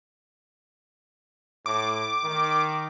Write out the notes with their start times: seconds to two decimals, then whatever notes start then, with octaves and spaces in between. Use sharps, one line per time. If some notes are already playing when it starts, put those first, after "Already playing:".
1.66 A2 D6
2.24 D#3